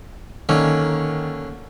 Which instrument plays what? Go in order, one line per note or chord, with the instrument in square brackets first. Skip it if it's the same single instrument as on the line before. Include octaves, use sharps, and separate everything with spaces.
[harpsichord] D3 A#3 C#4 [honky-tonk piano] D#3